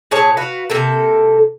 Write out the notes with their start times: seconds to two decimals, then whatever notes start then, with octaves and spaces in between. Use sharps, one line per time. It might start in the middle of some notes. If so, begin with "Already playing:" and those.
0.11 A#2 G#4 C#5 A5
0.37 F#4 B4 F5
0.70 C3 A#3 A4